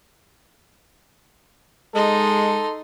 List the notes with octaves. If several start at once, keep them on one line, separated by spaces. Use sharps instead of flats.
G#3 D#4 A4 C6